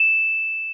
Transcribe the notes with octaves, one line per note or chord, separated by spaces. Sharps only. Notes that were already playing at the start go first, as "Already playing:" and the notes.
Already playing: E7